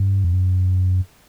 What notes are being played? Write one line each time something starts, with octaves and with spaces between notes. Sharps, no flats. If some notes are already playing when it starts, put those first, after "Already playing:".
Already playing: G2
F2
F#2